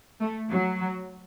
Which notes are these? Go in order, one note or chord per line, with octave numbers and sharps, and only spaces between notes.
A3
F#3